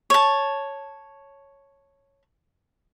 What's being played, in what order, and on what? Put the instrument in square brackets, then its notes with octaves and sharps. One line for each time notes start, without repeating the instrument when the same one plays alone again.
[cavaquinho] C#5 A5